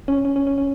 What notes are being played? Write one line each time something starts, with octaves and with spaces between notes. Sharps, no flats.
C#4
C#4
C#4
C#4
C#4